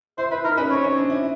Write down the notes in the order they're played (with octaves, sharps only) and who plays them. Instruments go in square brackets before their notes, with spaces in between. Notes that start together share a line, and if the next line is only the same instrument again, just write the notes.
[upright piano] E4 [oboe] C5
[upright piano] E4 [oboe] B4
[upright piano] D#4 [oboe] A#4
[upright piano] C#4 [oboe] B4
[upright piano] C4 [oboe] C#5
[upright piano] C#4
D4
E4